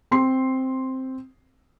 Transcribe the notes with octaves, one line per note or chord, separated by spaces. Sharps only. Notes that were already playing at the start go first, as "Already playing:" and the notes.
C4 C6 C7